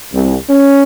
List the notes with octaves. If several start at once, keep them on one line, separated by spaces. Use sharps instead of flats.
C2
C#4